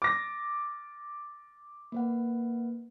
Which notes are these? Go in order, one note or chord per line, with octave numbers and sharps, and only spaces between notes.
D6 A6 A#6
A#3 B4 F#5